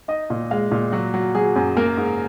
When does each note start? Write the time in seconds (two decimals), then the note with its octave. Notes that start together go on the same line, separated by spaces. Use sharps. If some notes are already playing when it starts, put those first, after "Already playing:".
0.08 D#4 D#5
0.30 A#2
0.51 G#3 F5
0.71 A#2
0.92 F#3 F#4
1.14 F#3
1.35 F#3 G#4
1.56 F#2
1.77 A#3 A#4
1.97 G#2